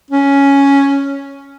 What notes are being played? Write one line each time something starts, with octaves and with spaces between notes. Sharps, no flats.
C#4